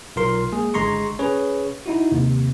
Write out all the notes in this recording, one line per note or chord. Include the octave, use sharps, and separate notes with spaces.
B1 F4 A#4 C6
G#3 A#3 G#4
G#1 D3 G#3 A#5 C6 C#6
C#4 G#4 B4 C#5
D#4 E4 F#4
D#2 C3